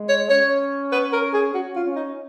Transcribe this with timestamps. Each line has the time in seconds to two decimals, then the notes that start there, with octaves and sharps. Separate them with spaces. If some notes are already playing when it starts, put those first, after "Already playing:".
Already playing: G#3
0.09 C#5
0.30 C#4 C#5
0.92 B4
1.13 A#4
1.34 G#4
1.54 C#4 F#4
1.76 F4
1.86 C#4
1.96 D#4